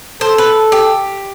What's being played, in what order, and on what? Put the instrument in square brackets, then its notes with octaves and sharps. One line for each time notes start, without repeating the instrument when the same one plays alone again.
[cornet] A4 [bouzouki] C5
[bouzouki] B4
G4